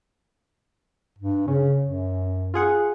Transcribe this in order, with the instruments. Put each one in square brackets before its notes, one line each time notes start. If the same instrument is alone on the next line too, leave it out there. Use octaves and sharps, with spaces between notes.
[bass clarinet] G2
[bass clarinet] C#3 [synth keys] C#4
[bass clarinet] F#2
[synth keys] F4 G#4 F#5